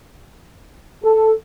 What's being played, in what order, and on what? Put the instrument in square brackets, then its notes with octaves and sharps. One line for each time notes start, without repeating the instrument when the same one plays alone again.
[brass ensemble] A4